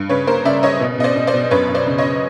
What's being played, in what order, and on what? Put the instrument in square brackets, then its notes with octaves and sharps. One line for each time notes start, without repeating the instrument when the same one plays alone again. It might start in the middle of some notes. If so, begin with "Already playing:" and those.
Already playing: [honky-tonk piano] G2
C#3 B4 C#5
A#3 A#4 C5
C#3 D5 E5
C#3 C#5 D#5
B2
B2 D#5
C5 D5
B2
C5 D5
B2
F#2 B4 C#5
F#2
C5 D5
C#3
C#5 D#5
C#3